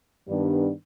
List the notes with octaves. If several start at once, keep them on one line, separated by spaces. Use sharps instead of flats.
G2 D#3 G3 B3 D4